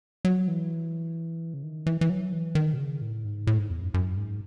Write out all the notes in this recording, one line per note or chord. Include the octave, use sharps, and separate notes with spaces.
F#3
E3
C#3
D#3
E3
E3
F#3
E3
D#3
B2
C#3
A2
G#2
A2
G#2
E2
F#2
F#2
G#2